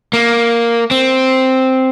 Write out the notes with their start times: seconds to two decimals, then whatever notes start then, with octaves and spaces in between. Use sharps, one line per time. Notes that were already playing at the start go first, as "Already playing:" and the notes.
0.13 A#3
0.91 C4